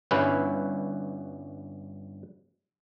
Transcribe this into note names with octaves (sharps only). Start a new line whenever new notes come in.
G1 G2 C#4 E4 B4